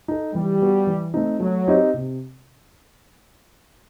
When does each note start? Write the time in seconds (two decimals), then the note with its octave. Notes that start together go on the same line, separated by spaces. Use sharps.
0.08 D#4 A4
0.34 E3 G3
0.61 B3 F#4
0.87 E3
1.14 A3 C4 D#4
1.40 F#3 A3
1.67 C4 D#4 G4 D#5
1.94 C3